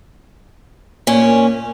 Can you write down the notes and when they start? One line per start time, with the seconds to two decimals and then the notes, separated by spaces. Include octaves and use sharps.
1.07 A#2 A#3 C#4